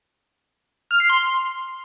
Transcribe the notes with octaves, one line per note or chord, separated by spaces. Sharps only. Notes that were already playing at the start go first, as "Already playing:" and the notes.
F6
C7
C6